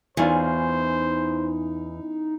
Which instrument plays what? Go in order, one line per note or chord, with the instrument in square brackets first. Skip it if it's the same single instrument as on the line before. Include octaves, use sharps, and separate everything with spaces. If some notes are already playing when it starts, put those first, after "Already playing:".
[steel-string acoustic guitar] E2 [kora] E3 C#4 F4 [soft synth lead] D#4 [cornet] C5